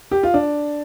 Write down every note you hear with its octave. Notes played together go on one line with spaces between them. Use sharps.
G4
F4
D4